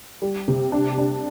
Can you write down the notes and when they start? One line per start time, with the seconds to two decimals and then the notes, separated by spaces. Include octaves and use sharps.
0.22 G3
0.48 C3
0.72 D4
0.98 D4